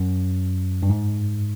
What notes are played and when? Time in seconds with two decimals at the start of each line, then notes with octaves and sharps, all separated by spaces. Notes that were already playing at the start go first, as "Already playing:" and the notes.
Already playing: F#2
0.83 G2
0.90 G#2